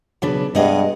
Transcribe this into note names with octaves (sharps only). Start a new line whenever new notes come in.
B1 C#3 D4 B4
G2 C3 G#3 B3 D#5